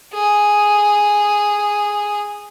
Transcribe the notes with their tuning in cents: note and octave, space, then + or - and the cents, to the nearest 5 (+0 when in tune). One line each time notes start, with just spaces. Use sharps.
G#4 -5